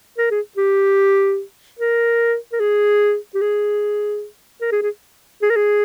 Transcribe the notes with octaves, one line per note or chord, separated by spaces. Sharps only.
A#4
G#4
G4
A#4
A#4
G#4
G4
G#4
A#4
G#4
G#4
G#4
A#4
G#4